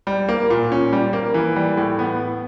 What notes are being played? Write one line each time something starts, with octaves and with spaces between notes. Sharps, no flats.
G3
A#3
A#2
C#4
G3
A#3
E3
G3
A2
B3